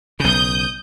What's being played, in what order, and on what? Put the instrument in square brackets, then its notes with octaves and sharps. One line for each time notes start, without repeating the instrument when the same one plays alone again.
[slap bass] B1 C#3 [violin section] D#6 G6